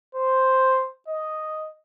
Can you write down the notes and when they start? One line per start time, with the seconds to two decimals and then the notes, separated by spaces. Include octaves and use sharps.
0.15 C5
1.08 D#5